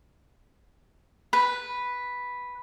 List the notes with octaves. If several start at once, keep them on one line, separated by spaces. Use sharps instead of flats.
B4